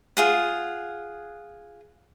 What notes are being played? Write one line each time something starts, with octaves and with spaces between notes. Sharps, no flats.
F4 G#4 F#5